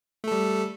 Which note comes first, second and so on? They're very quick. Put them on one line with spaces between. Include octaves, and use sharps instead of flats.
A3 A4 G3